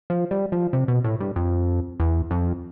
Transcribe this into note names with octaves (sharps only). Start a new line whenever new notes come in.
F3
G3
F3
C3
B2
A2
G2
F2
E2
F2